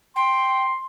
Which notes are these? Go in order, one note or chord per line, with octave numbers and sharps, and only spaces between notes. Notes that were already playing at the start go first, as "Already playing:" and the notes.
G5 C6